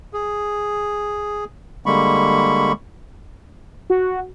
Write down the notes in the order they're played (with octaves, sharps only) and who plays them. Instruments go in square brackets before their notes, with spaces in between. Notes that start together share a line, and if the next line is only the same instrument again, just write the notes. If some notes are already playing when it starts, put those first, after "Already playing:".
[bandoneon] G#4
D3 G3 G#3 A#3 B5 C#6
[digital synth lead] F#4